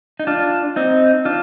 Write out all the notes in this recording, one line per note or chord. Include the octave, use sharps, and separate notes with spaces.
D#4
D4 F4
C4 D#4
D4 F4